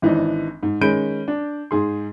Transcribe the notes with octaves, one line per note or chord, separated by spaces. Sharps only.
G#1 E3 D4 D#4
G#2
D#3 G#3 C#4 B5 G6 D7
D4
G#2 G#4 C6